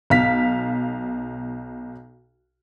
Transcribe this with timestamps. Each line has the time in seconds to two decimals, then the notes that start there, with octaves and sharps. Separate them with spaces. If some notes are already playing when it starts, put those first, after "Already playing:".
0.10 B1 F5 B6